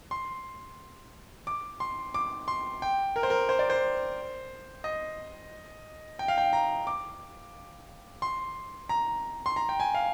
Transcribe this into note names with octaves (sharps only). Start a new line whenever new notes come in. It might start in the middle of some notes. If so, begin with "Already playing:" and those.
C6
D6
C6
D6
C6
G5
A#4
C5
A#4
C5
D5
C5
D#5
G5
F5
G5
A#5
D6
C6
A#5
C6
A#5
G5
G#5
F5